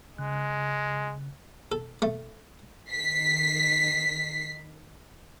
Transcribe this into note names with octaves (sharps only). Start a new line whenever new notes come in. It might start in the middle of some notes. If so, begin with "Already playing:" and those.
C#3 G#3 F#6
A4
A3
D#3 B6 C7